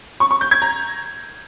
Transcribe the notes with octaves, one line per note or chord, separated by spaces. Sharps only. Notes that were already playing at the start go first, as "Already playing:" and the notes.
C#6
C#6
G6
G#6
A#5